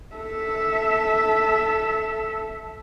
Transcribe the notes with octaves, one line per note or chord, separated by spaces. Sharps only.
A4 E5